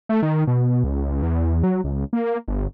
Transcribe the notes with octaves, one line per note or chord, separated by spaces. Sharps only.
A3
D#3
B2
C#2
E2
F#3
C#2
A#3
G1